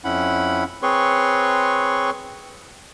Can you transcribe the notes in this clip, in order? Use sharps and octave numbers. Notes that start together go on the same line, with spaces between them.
F2 C#4 E4 F#5 B5
C4 G#4 B4 C#5 C6 C#6